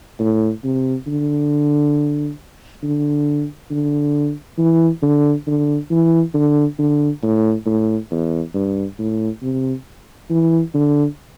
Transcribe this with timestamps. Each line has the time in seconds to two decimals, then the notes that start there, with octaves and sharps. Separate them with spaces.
0.19 A2
0.64 C3
1.07 D3
2.83 D3
3.70 D3
4.58 E3
5.02 D3
5.47 D3
5.91 E3
6.34 D3
6.79 D3
7.23 A2
7.66 A2
8.11 E2
8.54 G2
8.99 A2
9.42 C3
10.30 E3
10.74 D3